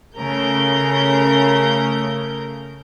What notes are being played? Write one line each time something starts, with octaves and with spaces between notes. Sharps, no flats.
C#3 A3 A#4 G6